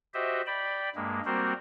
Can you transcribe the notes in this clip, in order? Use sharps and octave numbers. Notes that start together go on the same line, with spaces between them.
F#4 G4 C5 D#5 E5
D5 G5 B5
G2 G#3 A#3
G3 A#3 C4 F#4 A#4 C5